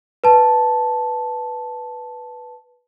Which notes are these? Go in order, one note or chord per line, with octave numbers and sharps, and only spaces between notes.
B4 A5